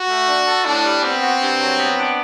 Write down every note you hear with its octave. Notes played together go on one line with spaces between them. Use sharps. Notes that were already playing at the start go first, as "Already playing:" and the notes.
Already playing: F#4
A3
D4
A4
A2 D4
G3
B3 C4
F#4
G2
F#3
B3
D4